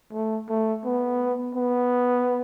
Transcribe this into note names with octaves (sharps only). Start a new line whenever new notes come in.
A3
A3
B3
B3